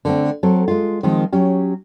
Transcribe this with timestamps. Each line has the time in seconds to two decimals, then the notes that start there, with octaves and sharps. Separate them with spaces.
0.05 D3 A3 C4
0.43 F#3 C4 A4
0.68 G#3 F4
1.03 D#3 F3 G#3 C4
1.32 F#3 C#4 G4